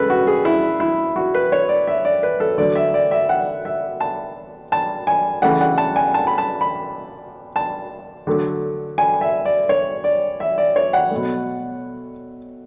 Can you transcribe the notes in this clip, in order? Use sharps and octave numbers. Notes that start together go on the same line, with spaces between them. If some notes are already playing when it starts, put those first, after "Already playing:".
Already playing: C#3 G#3 A4 B4
F#4
G#4
E4
E4
F#4
B4
C#5
D5
E5
D5
B4
A4
D3 F#3 A3 D5
E5
D5
E5
F#5
E5
A5
A5
G#5
C#3 E3 A3 F#5
F#5
A5
G#5
A5
B5
A5
B5
A5
D3 F#3 A3
G#5
E5
D5
C#5
D5
E5
D5
C#5
F#5
B2 F#3 A3